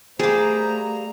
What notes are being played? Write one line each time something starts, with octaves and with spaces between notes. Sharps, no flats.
G3 A3 A#3 G#4 C5 A#5 D6